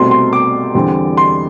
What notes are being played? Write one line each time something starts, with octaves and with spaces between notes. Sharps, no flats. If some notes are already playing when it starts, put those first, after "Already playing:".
Already playing: C2 B2 A3 C4 C6
C6
D6
E2 D3 G3 C4
C6